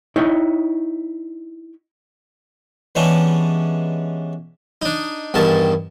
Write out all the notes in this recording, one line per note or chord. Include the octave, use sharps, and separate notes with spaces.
D#4 E4 C#5 D#5 G5
E3 G3 G#3 B3 C#4 D4
D4 D#4
E2 G2 D#3 A5